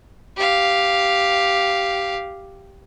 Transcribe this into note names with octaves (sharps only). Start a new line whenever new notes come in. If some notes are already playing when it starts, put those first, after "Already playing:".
G4 F5